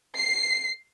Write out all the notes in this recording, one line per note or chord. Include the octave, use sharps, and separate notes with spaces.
C7